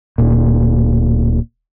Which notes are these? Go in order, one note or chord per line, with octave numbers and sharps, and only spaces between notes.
D1 A#2